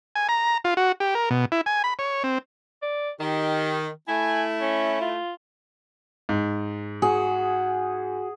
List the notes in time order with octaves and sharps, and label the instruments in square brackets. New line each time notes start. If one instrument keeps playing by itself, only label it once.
[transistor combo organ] G#5
A#5
F4
F#4
G4
A#4
B2
E4
G#5
B5
C#5
C4
[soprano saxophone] D5
[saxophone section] D#3 [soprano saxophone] G4
[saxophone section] A3 E4 [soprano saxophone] G#5
[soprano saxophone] C#4
F4
[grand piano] G#2
[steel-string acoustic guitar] F#4 [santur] G#4